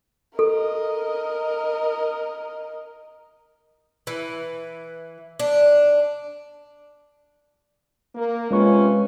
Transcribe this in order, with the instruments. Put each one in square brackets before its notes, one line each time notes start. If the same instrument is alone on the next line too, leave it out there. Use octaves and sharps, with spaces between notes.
[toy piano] A4 [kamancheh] A#4 D#5
[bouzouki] E3
D4
[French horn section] A#3
[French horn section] C3 C#4 F4 [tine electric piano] G#3 B4 C#6